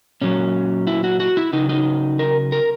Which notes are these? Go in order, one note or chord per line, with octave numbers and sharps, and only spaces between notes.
A#2 F#3 C#4
E4
F#4
F#4
E4
C#3 F#3 D#4
D#4
A#4
A#4